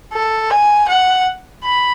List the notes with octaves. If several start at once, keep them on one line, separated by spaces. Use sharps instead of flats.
A4
G#5
F#5
B5